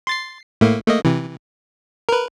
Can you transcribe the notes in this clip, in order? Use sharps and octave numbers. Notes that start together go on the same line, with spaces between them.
C6 A6 C7
A2 A3 A#3
A3 A#3 D#5
C3 E3
A#4 B4